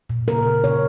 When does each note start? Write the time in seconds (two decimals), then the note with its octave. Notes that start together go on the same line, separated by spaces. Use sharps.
0.10 A#2
0.28 C#3 A#4
0.46 C#3
0.64 C#3 C#5